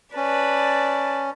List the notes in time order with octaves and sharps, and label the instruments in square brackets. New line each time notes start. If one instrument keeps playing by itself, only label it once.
[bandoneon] C#4 [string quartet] B4 D5 A5